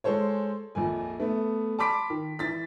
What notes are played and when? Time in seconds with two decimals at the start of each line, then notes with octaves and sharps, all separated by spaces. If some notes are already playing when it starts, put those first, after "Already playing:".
0.04 G#3 A4 C5 C#5
0.75 A#1 F2 A#2 G#5
1.20 A3 B3
1.79 A5 B5 C6 D6 B6 D7
2.10 D#3
2.39 E3 A6 B6